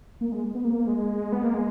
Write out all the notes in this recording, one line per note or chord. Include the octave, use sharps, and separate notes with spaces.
A#3
G#3
B3
A#3
G#3
B3
A#3
G#3